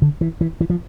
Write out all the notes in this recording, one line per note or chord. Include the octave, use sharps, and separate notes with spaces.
D3
E3
E3
E3
F3